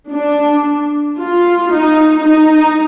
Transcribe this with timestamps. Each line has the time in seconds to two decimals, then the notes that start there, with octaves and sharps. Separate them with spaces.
0.12 D4
1.19 F4
1.73 D#4
2.26 D#4